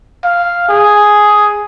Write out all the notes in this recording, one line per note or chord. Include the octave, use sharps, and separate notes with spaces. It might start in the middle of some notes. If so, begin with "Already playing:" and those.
F5
G#4